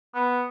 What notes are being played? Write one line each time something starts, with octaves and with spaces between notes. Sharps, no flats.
B3